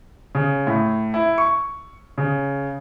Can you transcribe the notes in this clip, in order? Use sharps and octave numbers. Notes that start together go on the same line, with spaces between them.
C#3
A2
E4
C#6
C#3